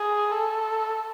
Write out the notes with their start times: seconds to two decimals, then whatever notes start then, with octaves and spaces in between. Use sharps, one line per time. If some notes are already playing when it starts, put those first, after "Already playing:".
Already playing: G#4
0.32 A4